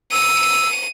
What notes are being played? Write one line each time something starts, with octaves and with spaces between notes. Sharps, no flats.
E6 D#7